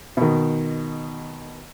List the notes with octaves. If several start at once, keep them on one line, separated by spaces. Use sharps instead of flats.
B2 D#3